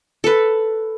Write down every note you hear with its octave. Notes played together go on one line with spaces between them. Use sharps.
A4 B4